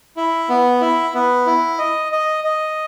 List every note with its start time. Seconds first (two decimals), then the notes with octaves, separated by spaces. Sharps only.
0.17 E4
0.49 B3
0.81 E4
1.14 B3
1.46 E4
1.79 D#5
2.12 D#5
2.44 D#5